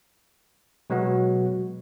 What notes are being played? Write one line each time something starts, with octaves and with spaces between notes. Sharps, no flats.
B2 F#3 G#3 B3 F#4